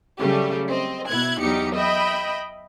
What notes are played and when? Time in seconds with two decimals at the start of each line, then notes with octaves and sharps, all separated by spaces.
0.18 C#3 F#3 G3 A3 G4
0.68 C4 D#5
1.07 B2 E4 F#6 G#6
1.41 E2 F#3 G3 D#4 G4 C#7
1.74 D#5 E5 G5 B5